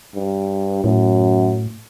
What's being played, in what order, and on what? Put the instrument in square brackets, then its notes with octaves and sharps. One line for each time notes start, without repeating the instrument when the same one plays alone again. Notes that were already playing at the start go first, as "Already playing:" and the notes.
[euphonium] G2
[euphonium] F#2 [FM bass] A2